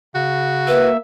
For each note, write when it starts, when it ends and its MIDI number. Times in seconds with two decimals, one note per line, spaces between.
0.15 0.89 49
0.15 0.91 66
0.68 0.97 58
0.68 0.90 71
0.68 0.97 76